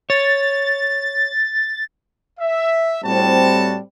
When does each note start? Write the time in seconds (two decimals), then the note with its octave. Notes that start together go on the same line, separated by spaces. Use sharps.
0.10 C#5 A6
2.39 E5
3.04 A2 G3 C4 F#4 A5